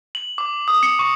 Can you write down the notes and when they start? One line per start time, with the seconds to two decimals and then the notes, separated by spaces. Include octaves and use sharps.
0.15 F#7
0.38 D6
0.68 D#6
0.83 C#7
0.99 C#6